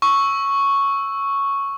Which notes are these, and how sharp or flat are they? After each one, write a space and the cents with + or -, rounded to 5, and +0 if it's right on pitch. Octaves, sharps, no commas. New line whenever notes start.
C#6 +0 E6 +0